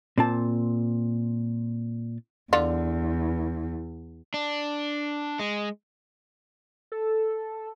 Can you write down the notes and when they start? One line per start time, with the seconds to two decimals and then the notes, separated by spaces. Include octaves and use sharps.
0.18 A#2 C4 A5
2.53 E2 D3 F4
4.34 D4
5.39 G#3
6.92 A4